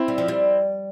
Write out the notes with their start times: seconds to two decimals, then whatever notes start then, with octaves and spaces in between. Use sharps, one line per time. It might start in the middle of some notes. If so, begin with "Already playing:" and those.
Already playing: C4 E4
0.08 G3
0.18 F3
0.28 G3